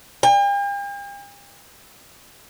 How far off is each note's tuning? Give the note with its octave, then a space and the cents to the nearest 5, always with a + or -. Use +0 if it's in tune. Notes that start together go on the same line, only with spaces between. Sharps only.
G5 +45